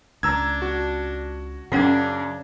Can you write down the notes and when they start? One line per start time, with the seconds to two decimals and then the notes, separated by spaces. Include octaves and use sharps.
0.23 C#2 D4 A#5 E6 G#6
0.62 F#4
1.72 F#2 C#3 C#4 D4 F5 F#5 G#6